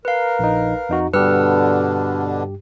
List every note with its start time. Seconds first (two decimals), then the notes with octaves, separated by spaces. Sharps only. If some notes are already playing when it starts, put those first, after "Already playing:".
0.05 A#4 B4 F5
0.39 A#1 D#4
0.89 F2 D#4 F#4
1.14 G2 B2 D3 D4 G4 B4 E6 F6